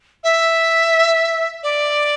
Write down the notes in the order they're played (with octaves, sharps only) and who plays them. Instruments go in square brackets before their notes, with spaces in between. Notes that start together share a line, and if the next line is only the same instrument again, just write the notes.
[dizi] E5
D5